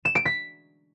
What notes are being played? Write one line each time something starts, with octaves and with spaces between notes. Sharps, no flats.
E7
D7
B6